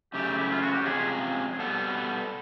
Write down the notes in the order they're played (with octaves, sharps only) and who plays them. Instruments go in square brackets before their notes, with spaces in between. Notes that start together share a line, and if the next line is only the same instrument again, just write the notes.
[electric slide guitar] F#2 C#3 F#3 A3 [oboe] G4
[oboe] E4
F4
F#4
G4
[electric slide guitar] F2 C3 F3 G#3 C#4 [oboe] G#4
[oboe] G#4
[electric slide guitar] B2 G3 B3 [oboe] A4
[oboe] A4